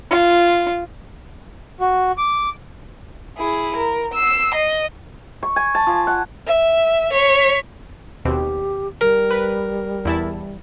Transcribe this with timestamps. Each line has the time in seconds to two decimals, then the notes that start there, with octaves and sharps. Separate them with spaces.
0.11 F4
1.80 F#4
2.18 D6
3.37 E4 G#4
3.76 A#4
4.14 E6 C7
4.54 D#5
5.43 C#6
5.56 G#5
5.75 A5
5.87 F3
6.07 F#5
6.47 E5
7.11 C#5 B6
8.25 D#2 B2 C4 G4
9.01 G3 A#4
9.31 B4
10.05 E2 E4 A5